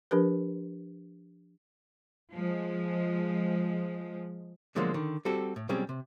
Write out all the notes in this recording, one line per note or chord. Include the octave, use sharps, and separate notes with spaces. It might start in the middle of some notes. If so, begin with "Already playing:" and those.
F3 D4 G4 A#4 B4
F3 G#3
B2 D3 F3 F#3 G#3 A#3
D3 D#3
G3 C4 F#4 G4 A4
A2
B2 F#3 G3 C4 C#4 G#4
C3